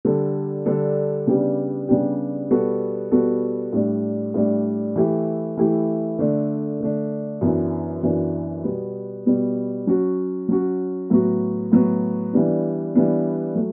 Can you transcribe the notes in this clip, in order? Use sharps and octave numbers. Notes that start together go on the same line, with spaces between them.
D3 G3 D4 A4
D3 G3 D4 A4
C#3 G3 B3 D4 G4
C#3 G3 B3 D4 G4
B2 G3 B3 F#4 A4
B2 G3 B3 F#4 A4
A2 G3 D4
A2 G3 D4
E3 A3 E4 G4
E3 A3 E4 G4
D3 A3 D4
D3 A3 D4
F#2 E3 B3 D4
F#2 E3 B3 D4
B2 G3 B3
B2 G3 B3
F#3 C#4 F#4
F#3 C#4 F#4
A2 F#3 B3 F#4
A2 F#3 B3 F#4
E3 G3 B3 D4
E3 G3 B3 D4
F#3 A3